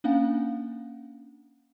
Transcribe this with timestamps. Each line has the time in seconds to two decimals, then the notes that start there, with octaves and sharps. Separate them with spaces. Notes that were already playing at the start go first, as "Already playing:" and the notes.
0.04 A#3 C#4 D4 F5 F#5 G#5